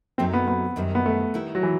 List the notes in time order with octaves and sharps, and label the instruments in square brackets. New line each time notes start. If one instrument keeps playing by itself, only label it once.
[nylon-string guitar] F#2 F#3 A3 D#4 [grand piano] C4
[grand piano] B3
B3
[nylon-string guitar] F#2 D#3 G3 C4
[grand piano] B3
A3
[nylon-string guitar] D#3 G3 B3 E4
[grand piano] F#3
E3